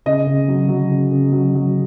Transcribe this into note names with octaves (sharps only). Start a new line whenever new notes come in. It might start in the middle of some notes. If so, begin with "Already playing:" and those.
C#3 D#5
C#3
F#3
F#3
C#3
C#3
F#3
F#3